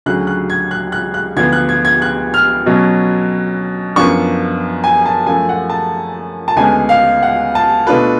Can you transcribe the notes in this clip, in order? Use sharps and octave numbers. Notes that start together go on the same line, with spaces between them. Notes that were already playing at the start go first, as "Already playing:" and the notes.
D2 C#3 F#3 F#6
F#6
G#6
F#6
F#6
F#6
D2 D3 F3 B3 D4 G#6
F#6
G#6
G#6
F#6
F6
B2 F#3 C#4
F#2 F3 B3 D4 C#6
G#5
A5
F#2 F3 A3 G#5
F#5
A5
A5
D2 C#3 G#3 B3 D4 G#5
F5
F#5
A5
B2 A3 D4 F4 B4